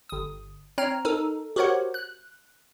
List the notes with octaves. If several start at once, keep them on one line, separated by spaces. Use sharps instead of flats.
G1 D#6
C4 C#5 A#5 F6
D#4 A4 A#4
F#4 G4 A#4 C5 C#5 F#5
F#6